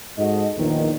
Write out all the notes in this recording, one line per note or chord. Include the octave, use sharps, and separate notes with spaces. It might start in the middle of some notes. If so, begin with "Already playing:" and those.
G#2 F#4 A4 D#5
A#1 E2 D#3